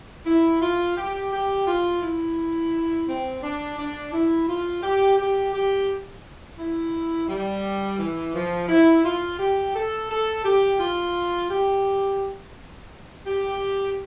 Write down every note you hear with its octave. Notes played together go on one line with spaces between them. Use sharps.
E4
F4
G4
G4
F4
E4
C4
D4
D4
E4
F4
G4
G4
G4
E4
G3
E3
F3
E4
F4
G4
A4
A4
G4
F4
G4
G4